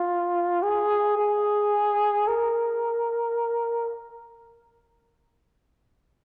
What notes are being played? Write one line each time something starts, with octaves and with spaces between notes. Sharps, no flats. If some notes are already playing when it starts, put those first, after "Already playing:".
Already playing: F4
G#4
G#4
A#4